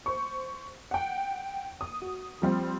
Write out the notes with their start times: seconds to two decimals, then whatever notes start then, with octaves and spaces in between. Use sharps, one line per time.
0.06 C5 C#6
0.91 F#5 G5
1.81 D#6
2.02 F#4
2.42 F3 G3 C4